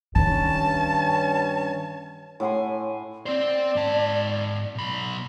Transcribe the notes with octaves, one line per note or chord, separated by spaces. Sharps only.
G2 D#3 C#4 A5
A2 F#5 G#5 C6
C4 C5 D5
G#2 A5
B1 B5